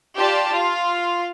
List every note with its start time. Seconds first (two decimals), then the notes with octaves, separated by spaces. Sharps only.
0.17 F4 G4 D5 A5
0.52 F4 F5